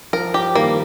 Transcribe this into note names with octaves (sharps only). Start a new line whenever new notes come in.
F3 A#4
F3 G4
D#3 G3 A#3